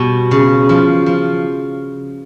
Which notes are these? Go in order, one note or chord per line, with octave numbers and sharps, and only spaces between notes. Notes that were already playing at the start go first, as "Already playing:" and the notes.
Already playing: B2 G3
C#3
F3
F3